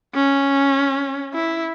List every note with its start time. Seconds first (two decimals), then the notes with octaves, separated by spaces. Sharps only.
0.15 C#4
1.34 E4